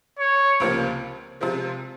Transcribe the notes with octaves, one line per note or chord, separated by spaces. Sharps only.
C#5
C#2 C3 F3 A#3
C3 F3 G#3